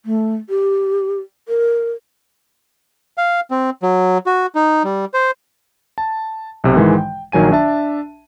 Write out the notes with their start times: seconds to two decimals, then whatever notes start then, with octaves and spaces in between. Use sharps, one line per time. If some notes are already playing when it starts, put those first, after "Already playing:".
0.05 A3
0.49 G4
1.48 A#4
3.18 F5
3.51 C4
3.83 F#3
4.26 F#4
4.55 D#4
4.84 G3
5.14 C5
5.98 A5
6.64 B1 C3
6.76 G#2 D#3 E3 G#3
6.98 G5
7.32 A#1 D#3 F#3 G#5 D#7
7.52 D4 E5 A5